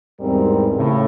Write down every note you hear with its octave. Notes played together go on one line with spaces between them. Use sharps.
E2 G#2 G3 C4 A#4
A2 C#3